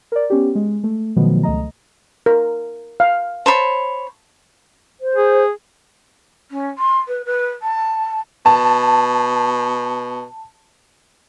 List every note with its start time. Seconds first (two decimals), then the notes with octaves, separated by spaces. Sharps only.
0.12 A#4 D5
0.30 B3 C#4 G4
0.55 G#3
0.84 A3
1.16 B2 D#3 F3 F#3 A3 B3
1.43 C#2 A3 D#5 A#5
2.26 A#4
3.00 F5
3.46 C5 C#5 A5 B5
5.00 C5
5.15 G#4
6.51 C#4
6.78 C6
7.08 B4
7.25 B4
7.62 A5
8.46 B2 A5